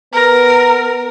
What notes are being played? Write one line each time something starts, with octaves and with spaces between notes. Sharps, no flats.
B3 A#4